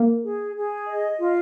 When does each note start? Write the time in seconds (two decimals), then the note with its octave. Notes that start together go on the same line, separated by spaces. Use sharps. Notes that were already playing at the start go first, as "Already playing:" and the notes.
Already playing: A#3
0.24 G#4
0.56 G#4
0.87 D#5
1.19 F4